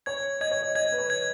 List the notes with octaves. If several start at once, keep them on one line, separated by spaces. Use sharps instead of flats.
C#5 G#6
D#5 G#6
C#5
D#5
D#5 G#6
B4
C#5
G#6